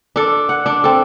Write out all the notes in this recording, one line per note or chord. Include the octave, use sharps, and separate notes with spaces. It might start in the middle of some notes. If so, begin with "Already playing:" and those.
D4 A4
F#5
D4
C4 A4